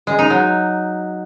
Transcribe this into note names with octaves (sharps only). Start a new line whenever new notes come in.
G#3
D#4
F#3